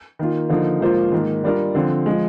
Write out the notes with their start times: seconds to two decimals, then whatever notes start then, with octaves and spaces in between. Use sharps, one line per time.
0.19 D#3 A#3 F4
0.49 D3 F3 A#3 D#4
0.81 G#2 F3 A#3 F4 C5
1.12 G#2 D#3 A#3
1.44 G3 D4 F4 A#4
1.75 D3 F3 C4
2.06 F3 G#3